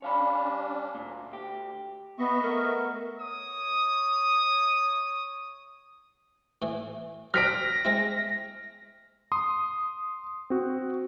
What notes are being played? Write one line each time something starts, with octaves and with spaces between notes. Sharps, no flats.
G3 C#4 D4 C#5 F5 B5
D2 A#2
G4
B3 D#5 E5 C#6
A3 B3 A#4
C#5 D#6
A2 E3
F#3 C4 D4 F6 A#6 B6 D7
G#3 C4 E4
C6 D#6
C4 F#4